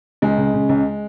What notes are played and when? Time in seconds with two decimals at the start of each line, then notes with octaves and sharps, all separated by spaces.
0.22 C#2 G#3
0.37 C#3
0.54 C#3
0.69 C#2